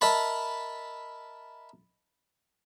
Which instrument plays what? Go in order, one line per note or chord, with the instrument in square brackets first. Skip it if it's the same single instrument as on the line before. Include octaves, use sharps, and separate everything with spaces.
[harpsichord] A#4 D#5 E5 A5 B5